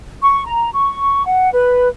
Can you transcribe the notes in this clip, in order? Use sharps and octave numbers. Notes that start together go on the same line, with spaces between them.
C#6
A#5
C#6
F#5
B4